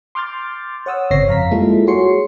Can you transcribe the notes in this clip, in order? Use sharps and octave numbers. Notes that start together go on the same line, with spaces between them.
C6 D6 F6 G6 A6
C#5 F#5 D#6 E6
G1 C#3 C4 C#5 A#6 C7
F2 F5 A#5 B6
G3 G#3 A#3 E4 F4 A4
F#4 G#4 C#5 C6 C7 C#7